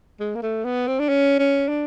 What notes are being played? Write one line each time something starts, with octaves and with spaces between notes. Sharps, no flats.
G#3
A#3
A3
B3
C4
D4
C#4
C#4
D4